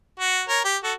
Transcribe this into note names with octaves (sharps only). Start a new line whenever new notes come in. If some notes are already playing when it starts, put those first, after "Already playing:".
F#4
A#4 C#5
G4
F#4 A4